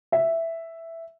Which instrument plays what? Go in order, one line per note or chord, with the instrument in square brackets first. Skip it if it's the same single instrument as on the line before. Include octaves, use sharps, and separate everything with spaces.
[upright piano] E5